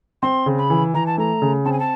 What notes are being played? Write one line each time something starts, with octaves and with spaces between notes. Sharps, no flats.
C4 C6
C#3
B5
E3
E3 A#5
A5
A3 A#5
C#3
C4 A5
G#5
A5